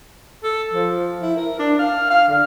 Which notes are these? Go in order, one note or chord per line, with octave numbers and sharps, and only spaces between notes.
A4
F3
E4
A#4
D4
F5
F5
D3